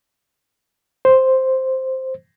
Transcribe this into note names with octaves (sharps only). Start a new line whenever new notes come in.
C5